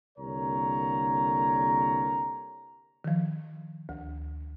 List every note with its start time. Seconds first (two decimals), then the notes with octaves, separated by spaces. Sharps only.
0.18 C2 D3 A#3 A#4 C#5 A#5
3.04 D#3 F3
3.89 D2